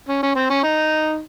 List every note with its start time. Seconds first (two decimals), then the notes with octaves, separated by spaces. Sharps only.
0.08 C#4
0.23 C#4
0.35 C4
0.50 C#4
0.63 D#4